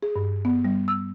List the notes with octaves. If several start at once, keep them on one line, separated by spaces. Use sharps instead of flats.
G#4
G2
B3
G3
E6